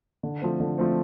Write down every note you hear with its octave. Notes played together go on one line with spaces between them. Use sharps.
D3
F3 A3 C4
D3
F3 A3 C4